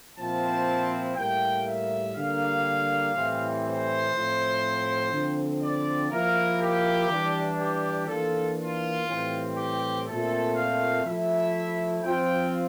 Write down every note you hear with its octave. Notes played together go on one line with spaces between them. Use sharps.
A#2 F3 C4 E4 A5
A2 G3 A#3 E4 G5
E5
D3 G3 A#3 F5
A2 E3 G3 C4
C5
A2 F3 C4 E4
D3 F3 C4
D5
F3 A#3 E4 A#4
G4
E3 G3 D4
G4
E3 A#3 D4 F4 A4
F4
A2 E3 G3 C4
G4
A#2 A3 C4 A4
F5
F3 A3 E4 E5
F3 C4 F4 G5